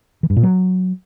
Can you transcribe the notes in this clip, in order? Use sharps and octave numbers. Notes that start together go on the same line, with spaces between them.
E3
G2
A#2
F#3